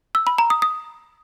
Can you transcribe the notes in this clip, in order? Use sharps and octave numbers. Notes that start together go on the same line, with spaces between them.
E6
B5
A#5
D#6
D#6